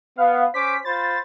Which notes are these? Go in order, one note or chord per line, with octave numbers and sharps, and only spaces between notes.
B3 F5
C#4 C5 D6 B6
F4 C5 B5 A6